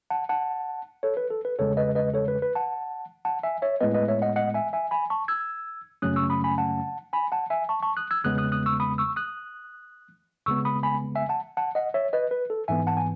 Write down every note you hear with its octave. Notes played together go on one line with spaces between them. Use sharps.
F#5 A5
F#5 A5
A4 C#5
B4
A4
B4
E2 C#3 G#3 A4 C#5
B4 D#5
B4 D#5
A4 C#5
B4
B4
F#5 A5
F#5 A5
E5 G#5
C#5 E5
A2 G#3 B3 B4 D#5
B4 D#5
C#5 E5
D#5 F#5
D#5 F#5
E5 G#5
E5 G#5
G#5 B5
A5 C#6
E6 G#6
F#2 C#3 F#3 A3 C#4 D#6 F#6
C#6 E6
B5 D#6
G#5 B5
F#5 A5
G#5 B5
F#5 A5
E5 G#5
A5 C#6
A5 C#6
D#6 F#6
E6 G#6
E2 C#3 G#3 B3 D#6 F#6
D#6 F#6
D#6 F#6
C#6 E6
B5 D#6
C#6 E6
D#6 F#6
D#2 C#3 G#3 B3 C#6 E6
B5 D#6
G#5 B5
E5 G#5
F#5 A5
F#5 A5
D#5 F#5
C#5 E5
B4 D#5
B4
A4
G#2 E3 B3 E5 G#5
F#5 A5
G#5